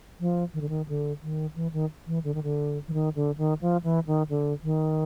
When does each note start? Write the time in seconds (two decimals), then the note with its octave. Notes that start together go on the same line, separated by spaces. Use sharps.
0.20 F3
0.54 D#3
0.61 D3
0.69 D#3
0.88 D3
1.23 D#3
1.56 E3
1.73 D#3
2.07 E3
2.24 D3
2.34 D#3
2.43 D3
2.88 E3
2.93 D#3
3.15 D3
3.38 D#3
3.61 F3
3.84 E3
4.07 D#3
4.29 D3
4.63 D#3